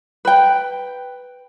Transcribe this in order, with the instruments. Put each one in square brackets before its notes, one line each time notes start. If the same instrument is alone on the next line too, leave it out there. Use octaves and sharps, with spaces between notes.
[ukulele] B4 G5